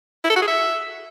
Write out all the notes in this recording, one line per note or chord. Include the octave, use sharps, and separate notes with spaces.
E4
A4
F#4
G#4
E5